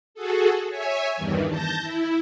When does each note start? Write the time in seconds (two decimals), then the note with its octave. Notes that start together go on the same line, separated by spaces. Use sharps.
0.14 F#4 G#4 A4
0.69 C#5 E5 G#5
1.17 E2 G2 D#3 E3
1.49 A5 G6 A#6
1.80 E4